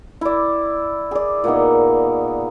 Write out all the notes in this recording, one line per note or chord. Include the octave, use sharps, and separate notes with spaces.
E4 D5
G#4 D5
A#2 A#3 B3 D#4